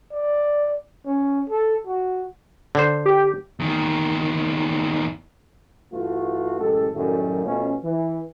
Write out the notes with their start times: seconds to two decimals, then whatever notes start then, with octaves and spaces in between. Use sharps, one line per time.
0.12 D5
1.06 C#4
1.49 A4
1.87 F#4
2.75 D3 C5
3.06 G4
3.60 E2 D#3
5.93 G2 E3 A3 F4 F#4
6.60 A1 F#2 G#3 G4 A4
6.94 F#2 A2 D#3 F#3 G3 A3
7.44 B2 F3 A3 C#4
7.84 E3